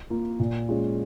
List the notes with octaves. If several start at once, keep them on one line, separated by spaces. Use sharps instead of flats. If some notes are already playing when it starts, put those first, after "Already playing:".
A#3 F4
A#2
G#3 C#4 F4